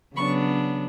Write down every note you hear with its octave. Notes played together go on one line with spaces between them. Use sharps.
C#3 F#3 B3 D4 B5 C#6